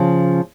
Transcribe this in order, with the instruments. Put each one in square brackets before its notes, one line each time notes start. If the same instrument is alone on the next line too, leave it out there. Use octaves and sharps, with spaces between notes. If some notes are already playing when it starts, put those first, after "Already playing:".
Already playing: [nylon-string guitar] C#3 F3